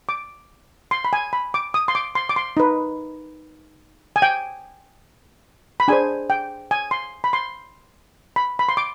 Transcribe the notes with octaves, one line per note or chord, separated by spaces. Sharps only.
D6
C6
B5
G#5
B5
D6
D#6
C6
D6
C6
D6
C6
D#4 B4
G#5
G5
B5
D4 G#4 C5 G#5
G5
G#5
C6
B5
C6
B5
B5
C6
D6